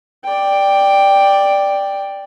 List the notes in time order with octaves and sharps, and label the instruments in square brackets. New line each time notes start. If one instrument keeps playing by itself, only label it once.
[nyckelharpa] D5 G5